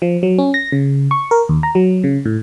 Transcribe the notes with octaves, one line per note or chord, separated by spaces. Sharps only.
F3
F#3
C#4
A#6
C#3
C#6
A#4
D#2
A#5
F#3
C#3
A2